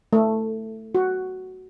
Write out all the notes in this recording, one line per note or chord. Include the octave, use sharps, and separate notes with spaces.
A3
F#4